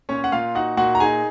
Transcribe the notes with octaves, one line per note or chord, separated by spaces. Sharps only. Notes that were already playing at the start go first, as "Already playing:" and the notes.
A#2 C#4 C#5
F#5
A#2 F4 F5
D#4 F#4 F#5
A#2 F#4 F#5
A#5
D#4 G#4 G#5